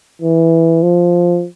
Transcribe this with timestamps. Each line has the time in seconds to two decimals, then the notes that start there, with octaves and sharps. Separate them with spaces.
0.22 E3
0.83 F3